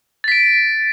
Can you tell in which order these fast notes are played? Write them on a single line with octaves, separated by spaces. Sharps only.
A6 B6 D7